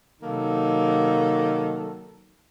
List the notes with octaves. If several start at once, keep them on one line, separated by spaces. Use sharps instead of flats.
C3 D#3 F#3 A#3 D#4 A4